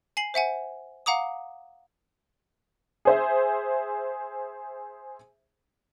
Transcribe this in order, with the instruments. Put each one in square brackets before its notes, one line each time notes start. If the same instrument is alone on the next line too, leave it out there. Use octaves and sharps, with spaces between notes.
[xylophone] G#5 C7 F#7
C5 E5 F#5 G#5
F5 F#5 A#5 D6 D#6
[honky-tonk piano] G#4 C5 E5